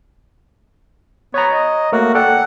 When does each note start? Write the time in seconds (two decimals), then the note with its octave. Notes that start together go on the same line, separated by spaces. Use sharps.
1.34 B3 C#5 A#5
1.52 D#5
1.92 A3 A#3 F#4 A#4
2.15 A4 D5 F#5 G5